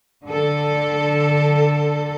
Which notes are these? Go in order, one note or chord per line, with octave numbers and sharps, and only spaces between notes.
D3 A4